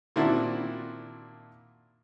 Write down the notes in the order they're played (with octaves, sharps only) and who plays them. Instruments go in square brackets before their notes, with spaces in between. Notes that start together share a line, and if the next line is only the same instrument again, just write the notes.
[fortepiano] A#2 D#3 C4 D4 E4 F#4